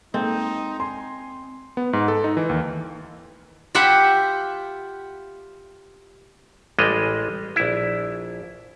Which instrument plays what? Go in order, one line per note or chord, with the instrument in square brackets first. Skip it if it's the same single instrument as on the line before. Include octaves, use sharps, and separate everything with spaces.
[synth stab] G#3 A#3 A4 [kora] C4 [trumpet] D#4
[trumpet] G#5 [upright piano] C6
[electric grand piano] B3
G#2
A4
D#4
E3
D#2
[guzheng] F4 G4 E5 F#5 B5
[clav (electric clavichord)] A1 G3 G#3 D#5
A#1 E4